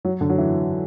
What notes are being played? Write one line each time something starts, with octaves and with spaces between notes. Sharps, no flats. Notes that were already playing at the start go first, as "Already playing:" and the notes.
F#3
D3
F#3
E3